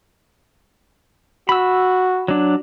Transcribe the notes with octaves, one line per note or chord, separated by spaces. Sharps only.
F#4 B5 E6
F#3 D4